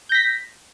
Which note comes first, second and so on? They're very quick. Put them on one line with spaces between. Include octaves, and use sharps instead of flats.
G6 A#6 B6